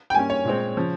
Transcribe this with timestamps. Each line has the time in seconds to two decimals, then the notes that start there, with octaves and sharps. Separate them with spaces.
0.10 G5
0.15 G2 G3 A#3 C#4 G#5
0.30 C#5
0.45 A#2 G#3 C4
0.77 C#3 F3